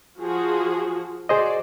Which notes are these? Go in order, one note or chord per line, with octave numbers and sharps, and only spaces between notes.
F3 F#4 G#4
F#4 G#4 C5 D5 D#5